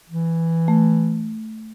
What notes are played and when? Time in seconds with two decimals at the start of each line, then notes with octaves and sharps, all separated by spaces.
0.09 E3
0.68 A3